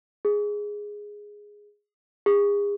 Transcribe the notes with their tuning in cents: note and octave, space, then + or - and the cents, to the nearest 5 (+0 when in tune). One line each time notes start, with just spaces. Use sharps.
G#4 -5
G#4 -35